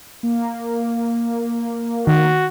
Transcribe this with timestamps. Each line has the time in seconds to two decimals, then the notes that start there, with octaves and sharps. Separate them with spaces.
0.23 A#3
2.07 D#3 F#4